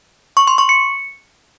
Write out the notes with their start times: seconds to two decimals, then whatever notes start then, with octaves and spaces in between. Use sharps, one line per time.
0.37 C#6
0.47 C6
0.58 C#6
0.69 C#7